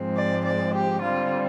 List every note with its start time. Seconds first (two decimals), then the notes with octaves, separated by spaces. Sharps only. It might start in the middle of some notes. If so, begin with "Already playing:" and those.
Already playing: G#2 F3 G#3 C4
0.16 D5
0.45 D5
0.73 G4
1.01 D3 G3 C4 F4